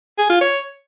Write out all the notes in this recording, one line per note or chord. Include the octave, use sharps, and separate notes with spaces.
G#4
F4
C#5